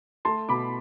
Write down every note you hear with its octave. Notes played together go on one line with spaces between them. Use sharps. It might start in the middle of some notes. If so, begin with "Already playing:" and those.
A3 A5 C6
B2 B5 D6